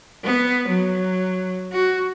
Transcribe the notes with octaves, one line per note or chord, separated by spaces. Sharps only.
B3
F#3
F#4